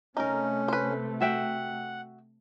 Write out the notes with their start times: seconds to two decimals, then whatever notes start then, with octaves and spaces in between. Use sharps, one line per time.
0.17 C3 A3 C#4 D#4 A#4
0.68 B4 C5
1.20 F#4 E5 F#5 G5